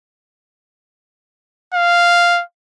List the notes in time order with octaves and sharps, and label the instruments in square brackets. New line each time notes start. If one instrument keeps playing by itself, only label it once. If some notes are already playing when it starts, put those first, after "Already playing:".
[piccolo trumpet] F5